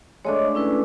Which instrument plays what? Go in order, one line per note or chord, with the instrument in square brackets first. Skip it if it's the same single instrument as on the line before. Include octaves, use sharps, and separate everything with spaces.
[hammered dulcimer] G#3 A3 D4 [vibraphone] C#5 D#5
[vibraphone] C#4 E4 B4